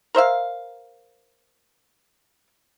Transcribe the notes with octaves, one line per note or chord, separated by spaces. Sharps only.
A#4 C5 E5 F5